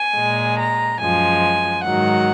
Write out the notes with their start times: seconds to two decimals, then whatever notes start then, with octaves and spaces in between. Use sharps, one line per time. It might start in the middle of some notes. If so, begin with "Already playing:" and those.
Already playing: G#5
0.15 A#2 G#3
0.58 A#5
1.00 F#2 F3 G#3 G#5
1.84 G#2 D#3 F#3 F#5